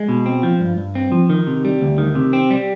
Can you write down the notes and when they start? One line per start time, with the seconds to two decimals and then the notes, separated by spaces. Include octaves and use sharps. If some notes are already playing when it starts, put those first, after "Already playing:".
Already playing: G#3
0.09 B2
0.26 C4
0.43 F3
0.60 G2
0.78 G2
0.95 C4
1.12 F3
1.30 D#3
1.47 C3
1.65 G3
1.81 D2
1.98 D#3
2.15 C3
2.33 C4
2.51 G3